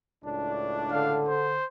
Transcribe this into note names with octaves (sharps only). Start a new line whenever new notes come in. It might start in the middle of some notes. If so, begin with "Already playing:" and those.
C#2 A2 D4
D3 F5
C5